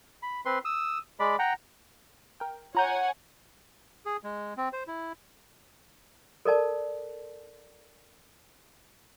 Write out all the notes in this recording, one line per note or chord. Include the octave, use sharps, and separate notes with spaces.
B5
C4 B4 C6
D#6 E6
G#3 D5 B5
F#5 G5 A#5
A#4 G5
F4 C#5 F#5 G#5 A#5 G6
G#4
G#3
C4
C5
E4
A4 A#4 D5 A5